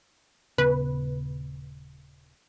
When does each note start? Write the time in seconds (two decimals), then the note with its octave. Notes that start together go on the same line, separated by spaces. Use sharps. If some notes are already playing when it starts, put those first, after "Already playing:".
0.58 D#1 C#3 B3 B4